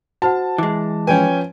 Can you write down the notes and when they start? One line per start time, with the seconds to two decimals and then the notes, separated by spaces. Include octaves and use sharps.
0.22 F#4 C5 F#5 A5
0.58 E3 G#3 D6
1.07 F3 C#4 B4 G5 G#5